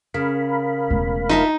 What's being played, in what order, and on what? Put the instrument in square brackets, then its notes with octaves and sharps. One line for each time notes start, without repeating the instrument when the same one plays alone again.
[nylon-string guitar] C#3 [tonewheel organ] A#4 F5 B5
[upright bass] E1 A3
[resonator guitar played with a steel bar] D#4 [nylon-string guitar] F4 E5 A5